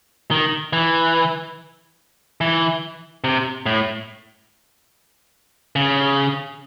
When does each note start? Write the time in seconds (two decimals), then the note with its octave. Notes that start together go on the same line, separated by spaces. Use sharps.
0.31 D#3
0.73 E3
2.41 E3
3.24 C3
3.66 A2
5.76 C#3